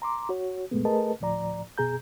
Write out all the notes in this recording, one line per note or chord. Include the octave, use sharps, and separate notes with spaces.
A#5 C6 D6
F#4 C#5
C2 F#2 A#2 G#3 A3 B3
A3 G#4 A#4 B4 D#5 A5
D2 A2 F3 D5 A#5
F#2 B2 G#4 A#5 G6